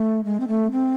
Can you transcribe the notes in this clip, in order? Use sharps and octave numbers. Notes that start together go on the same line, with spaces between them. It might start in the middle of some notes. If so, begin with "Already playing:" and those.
Already playing: A3
G#3
C4
A3
C4